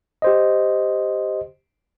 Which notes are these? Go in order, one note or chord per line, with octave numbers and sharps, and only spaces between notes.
G4 C5 D#5